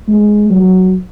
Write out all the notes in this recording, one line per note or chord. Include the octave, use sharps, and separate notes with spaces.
G#3
F#3